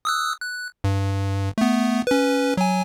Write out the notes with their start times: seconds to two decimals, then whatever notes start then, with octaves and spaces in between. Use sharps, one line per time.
0.05 D#6 E6 F#6
0.41 F#6
0.84 G2
1.58 A3 B3
2.07 C#4 B4
2.57 F#3 G#5